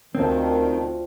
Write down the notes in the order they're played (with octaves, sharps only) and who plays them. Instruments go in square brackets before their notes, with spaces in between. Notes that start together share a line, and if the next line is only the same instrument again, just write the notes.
[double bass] D2 D3 [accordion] D#3 [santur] F3 F4 G5 [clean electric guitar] C4